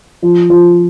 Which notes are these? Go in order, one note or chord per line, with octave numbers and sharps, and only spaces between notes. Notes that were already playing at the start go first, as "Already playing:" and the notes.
F3
F3